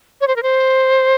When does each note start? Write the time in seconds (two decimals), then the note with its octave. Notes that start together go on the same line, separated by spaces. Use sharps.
0.21 C#5
0.28 C5
0.36 A#4
0.43 C5